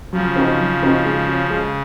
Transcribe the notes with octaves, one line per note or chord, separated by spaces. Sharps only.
C#3 F3 F#3
C4 D#4 F#4
F#3
C4 D#4 F#4
G#3
C#4 F#4
C#3 G#3